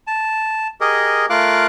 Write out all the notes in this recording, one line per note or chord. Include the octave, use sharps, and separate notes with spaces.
A5
G4 G#4 A#4 D#5
A3 F4 A#4 F5 D6 F#6